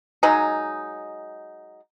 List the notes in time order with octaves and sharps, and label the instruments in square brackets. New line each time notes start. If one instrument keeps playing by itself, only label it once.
[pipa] F#3 G#3 D#4